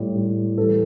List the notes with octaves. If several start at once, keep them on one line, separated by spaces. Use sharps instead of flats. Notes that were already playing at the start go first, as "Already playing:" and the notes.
Already playing: A2 G3
A2 G3
A2 E3 G3 A4